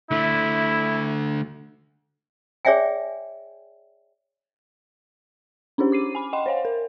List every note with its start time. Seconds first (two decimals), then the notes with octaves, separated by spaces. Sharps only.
0.11 D3 A3 E4
2.65 G#4 C#5 D5 E5 G5 G#5
5.78 C#4 D4 E4 G4 C5
5.92 D6 C7 D#7
6.15 G#5 B5
6.33 D#5 F#5 G5 B5 C6
6.46 C5 C#5 F5 G#5
6.65 A#4